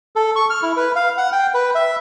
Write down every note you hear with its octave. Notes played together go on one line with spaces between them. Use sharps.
A4
C#6
F6
E4
B4
F5
F#5
G5
B4
E5